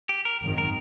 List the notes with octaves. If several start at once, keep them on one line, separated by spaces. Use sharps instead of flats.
G4
A#4
G#1 F#2 D#3
A#4